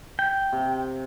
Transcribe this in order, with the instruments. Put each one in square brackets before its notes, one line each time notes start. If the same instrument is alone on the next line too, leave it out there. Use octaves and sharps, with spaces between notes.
[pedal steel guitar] G5
[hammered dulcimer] C3